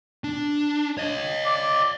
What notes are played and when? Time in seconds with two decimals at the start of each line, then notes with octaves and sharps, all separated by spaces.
0.24 D4
0.98 C#5 D#5
1.46 D5